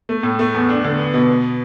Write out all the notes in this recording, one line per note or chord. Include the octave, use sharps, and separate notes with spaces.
A3
A2
A3
E2
D4
D3
B3
B2
B3